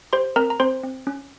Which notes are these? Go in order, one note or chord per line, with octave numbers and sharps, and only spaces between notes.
G4 C5 C6
C4 A#4 A#5
A#5
C4 C5 C6
C4
C#4